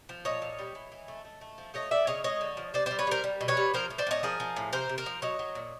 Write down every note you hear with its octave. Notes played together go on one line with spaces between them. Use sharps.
F3
A#2 C#5 D#5
A#2
G3
E3
E3
A3
A3
A3
F3
A3 C#5 D#5
A3 D5 E5
C#3 C#5 D#5
G#3 C#5 D#5
D3
F3
C3 C5 D5
G3 C5 D5
B4 C#5
G3 A#4 C5
G3
B2
B4 C#5
G3
F3 A#4 C5
A2
C5 D5
A2 C#5 D#5
F3 G#4 A#4
F3
A2
C3 A#4 C5
C3
A#4 C5
F3
F#3 C#5 D#5
F#3
A#2